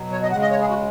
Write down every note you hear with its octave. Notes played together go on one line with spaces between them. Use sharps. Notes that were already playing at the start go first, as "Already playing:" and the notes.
Already playing: B2 F#3
C#5
D#5
C#3 G#3 F#5
D#5
C#5
G#4
F#4